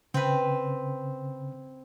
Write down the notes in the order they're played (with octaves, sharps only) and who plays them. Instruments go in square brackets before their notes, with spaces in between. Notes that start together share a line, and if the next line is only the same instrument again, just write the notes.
[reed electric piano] C#3 [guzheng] C4 B4